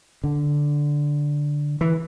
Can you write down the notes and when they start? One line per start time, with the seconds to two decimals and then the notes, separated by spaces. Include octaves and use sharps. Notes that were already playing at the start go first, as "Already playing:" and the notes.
0.24 D3
1.81 E3